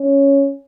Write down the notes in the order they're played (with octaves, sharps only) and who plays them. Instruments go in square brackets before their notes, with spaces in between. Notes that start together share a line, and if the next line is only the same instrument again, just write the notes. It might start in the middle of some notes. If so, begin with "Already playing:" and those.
Already playing: [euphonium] C#4